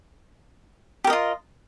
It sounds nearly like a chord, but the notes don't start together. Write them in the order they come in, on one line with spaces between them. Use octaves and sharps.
G4 A#4 D#5 F4